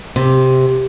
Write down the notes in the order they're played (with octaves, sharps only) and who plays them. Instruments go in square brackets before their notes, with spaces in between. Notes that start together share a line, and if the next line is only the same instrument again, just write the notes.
[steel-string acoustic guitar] C3